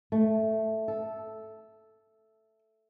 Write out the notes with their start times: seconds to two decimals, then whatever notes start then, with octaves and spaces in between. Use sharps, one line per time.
0.12 A3
0.88 A4